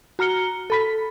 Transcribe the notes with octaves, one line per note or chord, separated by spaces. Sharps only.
F#4 A#5 F6 C#7 G7
A4 B5 B6